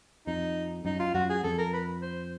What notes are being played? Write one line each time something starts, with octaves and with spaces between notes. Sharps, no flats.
F2 D#4
F#2 D#4
F4
F#2 F#4
G#4
F2 A4
A#4
B4
C5